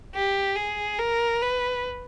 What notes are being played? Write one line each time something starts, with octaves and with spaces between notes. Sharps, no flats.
G4
G#4
A#4
B4